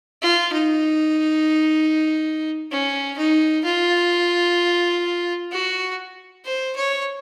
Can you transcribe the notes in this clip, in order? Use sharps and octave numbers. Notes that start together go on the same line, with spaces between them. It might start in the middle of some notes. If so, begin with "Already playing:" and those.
F4
D#4
C#4
D#4
F4
F#4
C5
C#5